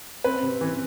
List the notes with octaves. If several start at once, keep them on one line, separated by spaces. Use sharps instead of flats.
C4 B4
C3
E3